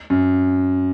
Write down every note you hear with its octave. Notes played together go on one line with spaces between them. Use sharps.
F#2